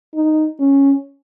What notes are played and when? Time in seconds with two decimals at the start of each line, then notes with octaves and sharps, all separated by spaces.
0.15 D#4
0.60 C#4